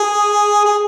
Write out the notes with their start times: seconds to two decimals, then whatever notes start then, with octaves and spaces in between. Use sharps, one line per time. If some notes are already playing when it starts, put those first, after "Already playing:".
Already playing: G#4
0.65 G#4